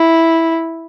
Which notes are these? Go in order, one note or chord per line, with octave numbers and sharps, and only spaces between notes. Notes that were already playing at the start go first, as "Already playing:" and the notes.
Already playing: E4